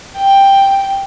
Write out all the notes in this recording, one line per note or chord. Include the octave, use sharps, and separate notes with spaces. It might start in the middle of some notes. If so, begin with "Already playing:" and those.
G5